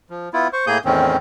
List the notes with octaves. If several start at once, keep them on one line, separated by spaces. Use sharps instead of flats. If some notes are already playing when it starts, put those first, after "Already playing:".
F3
B3 E4 F4
C5 C#6
A2 A#3 G#4 D#6 G6
E2 A2 D#3 C4 C#4